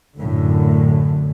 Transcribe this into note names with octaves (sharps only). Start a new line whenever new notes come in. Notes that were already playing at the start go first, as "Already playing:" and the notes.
F#2 A2 D3